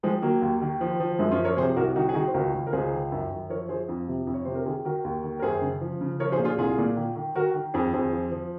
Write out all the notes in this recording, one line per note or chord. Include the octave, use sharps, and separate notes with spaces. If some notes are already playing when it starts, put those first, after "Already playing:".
D#3 F3 G#3
D#3 F#3 A#3
D#2
D#3
F3
F3
F#2 G#3 C4
C#4 F4
F3
A#4 C#5
C3 G#4 C5
C2 F#4 A#4
D#3 D#4 F#4
G#4
D#3 D#4 F#4
C5
C#2 F#4 A#4
C#2
A#4
C#2 G#4 C5
D#3
F#2
F#2
F3 A#4 C#5
F3 G#4 C5
F2
C3
F2
C#5
C3 C5
A#4
D#3 F4 G#4
D#3 F#4 A#4
D#2
D#3
A#4
F#2 G#4 C5
C#3
F3
C#3
F3 A#4 C#5
G#4 C5
A#2
F4 G#4
C2 F4 G#4
A#2
D#3
D#3
D#3 F#4 A#4
D#3
F2 G#4 C5
F2 G#4 C5
F3
F3